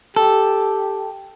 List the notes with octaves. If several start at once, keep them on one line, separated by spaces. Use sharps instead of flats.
G4 A4